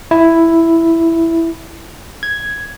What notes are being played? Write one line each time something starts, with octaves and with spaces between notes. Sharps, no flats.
E4
G#6